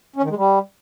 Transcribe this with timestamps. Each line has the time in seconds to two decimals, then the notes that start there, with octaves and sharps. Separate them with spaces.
0.16 C#4
0.23 D#3
0.30 G#3
0.37 G3